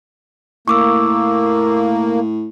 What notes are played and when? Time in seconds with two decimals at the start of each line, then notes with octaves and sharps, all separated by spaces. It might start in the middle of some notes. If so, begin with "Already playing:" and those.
0.68 A2 A#3 C#6 D6 E6